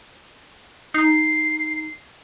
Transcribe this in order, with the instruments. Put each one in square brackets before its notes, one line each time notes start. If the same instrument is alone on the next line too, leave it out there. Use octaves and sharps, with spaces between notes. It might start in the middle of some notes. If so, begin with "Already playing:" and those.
[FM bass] D#4 [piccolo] C7